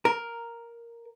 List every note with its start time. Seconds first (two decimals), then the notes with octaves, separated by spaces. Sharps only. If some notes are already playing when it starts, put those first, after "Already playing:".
0.05 A#4